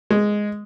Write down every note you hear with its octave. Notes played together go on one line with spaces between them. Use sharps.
G#3